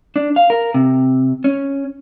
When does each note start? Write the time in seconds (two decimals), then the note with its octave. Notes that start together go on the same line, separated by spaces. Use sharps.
0.16 D4
0.36 F5
0.50 A#4
0.74 C3
1.44 C#4